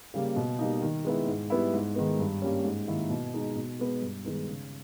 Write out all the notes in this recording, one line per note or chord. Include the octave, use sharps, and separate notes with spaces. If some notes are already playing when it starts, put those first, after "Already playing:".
C#3 G3 A#3
B2
G3 A#3 D#4
D#3
G#3 B3 E4
G#2
G3 B3 E4
G#2
D#3 G#3 B3
G2
G3 A#3 C#4
G#2
D#3 A#3 E4
B2
G#3 D#4
B2
G#3 B3
G2
D#3 G#3 B3 D#4
C#3